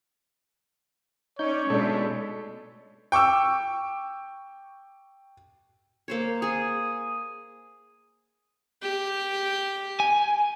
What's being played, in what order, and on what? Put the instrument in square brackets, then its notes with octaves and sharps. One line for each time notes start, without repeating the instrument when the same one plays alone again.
[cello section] C#4 D5 [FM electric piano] D#4 G6 [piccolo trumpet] C#5
[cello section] B2 G#3 A3 [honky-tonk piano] D4 A4
[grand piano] G5 C#6 D6 E6
[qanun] A#3 C5 C#5
[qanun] G#4 G#5 [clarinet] D#6
[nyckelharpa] G4
[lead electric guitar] G#5